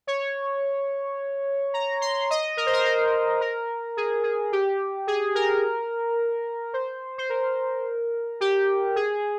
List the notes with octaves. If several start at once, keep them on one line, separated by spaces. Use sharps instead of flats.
C#5
A#5
C6
D#5
A#4
C5
A#4
C5
A#4
G#4
G#4
G4
G#4
A#4
C5
C5
A#4
G4
G#4